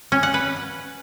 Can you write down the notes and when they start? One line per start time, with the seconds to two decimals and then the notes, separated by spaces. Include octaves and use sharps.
0.12 C#4
0.23 F#5
0.34 B4